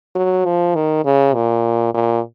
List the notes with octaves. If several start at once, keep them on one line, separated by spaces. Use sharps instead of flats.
F#3
F3
D#3
C#3
A#2
A#2